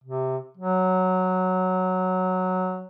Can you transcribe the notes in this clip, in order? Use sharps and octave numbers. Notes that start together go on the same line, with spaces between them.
C3
F#3